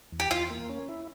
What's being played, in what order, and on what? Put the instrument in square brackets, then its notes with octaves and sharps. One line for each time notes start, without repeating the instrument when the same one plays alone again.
[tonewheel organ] E2
[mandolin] G4
[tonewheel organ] E2 [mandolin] F4
[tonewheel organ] A#3
C#4
E4